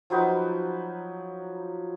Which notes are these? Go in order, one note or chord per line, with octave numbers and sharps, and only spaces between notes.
F3 F#3 D#4 B4